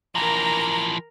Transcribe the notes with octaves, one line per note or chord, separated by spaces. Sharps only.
E3 F3 A#4 A#5